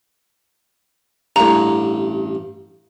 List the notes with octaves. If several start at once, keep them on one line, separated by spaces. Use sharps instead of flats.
A1 G2 A#5